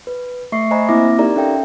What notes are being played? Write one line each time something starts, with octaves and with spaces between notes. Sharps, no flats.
B4
A3 E5 C#6 C7
C5 D#5 G#5 A#5 B5
A#3 C4 E4 E5 D6 A#6
D#4 G4 A#4 D5 A#5
C#4 A4 E5 F5 G5